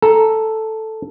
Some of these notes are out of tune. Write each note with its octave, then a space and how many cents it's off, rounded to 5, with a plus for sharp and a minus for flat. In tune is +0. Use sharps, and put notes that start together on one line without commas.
A4 +0 A#5 +0